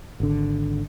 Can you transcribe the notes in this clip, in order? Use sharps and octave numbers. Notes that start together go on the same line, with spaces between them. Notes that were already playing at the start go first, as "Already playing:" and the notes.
G#1 D3